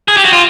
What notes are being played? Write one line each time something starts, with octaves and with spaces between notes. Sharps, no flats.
G#4
G4
F#4
F4